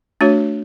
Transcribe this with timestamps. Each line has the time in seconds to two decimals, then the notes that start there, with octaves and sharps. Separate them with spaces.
0.21 A3 D4 F#4 C#5